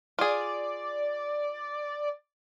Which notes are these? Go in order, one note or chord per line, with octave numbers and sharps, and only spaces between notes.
F4 G#4 D5